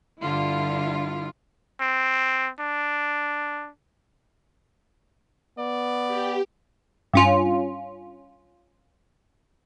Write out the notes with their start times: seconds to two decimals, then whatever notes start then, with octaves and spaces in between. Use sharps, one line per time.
0.21 G2 D3 E4 F4
1.80 C4
2.60 D4
5.58 B3 D5
6.08 G4
7.13 G2 C#4 F4